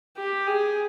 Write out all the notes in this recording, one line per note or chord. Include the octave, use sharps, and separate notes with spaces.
G4
G#4